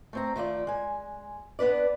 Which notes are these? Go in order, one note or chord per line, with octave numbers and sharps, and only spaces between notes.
A3 C4 A#5
D#3 A3 F4 D5
G#3 G#5
B3 D4 B4 D5